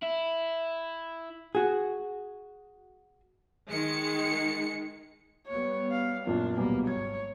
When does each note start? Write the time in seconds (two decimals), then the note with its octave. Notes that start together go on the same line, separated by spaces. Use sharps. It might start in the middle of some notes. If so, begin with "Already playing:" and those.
0.02 E4
1.55 F#4 G#4
3.70 D#3 G#3 C#7
5.47 G3 B3 C#5
5.92 F5
6.27 F#2 A#2 D4
6.57 D2 B2 F#3 G3 A#3
6.87 G#1 C#5 G#6